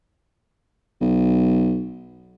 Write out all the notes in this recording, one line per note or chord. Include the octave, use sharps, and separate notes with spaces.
B1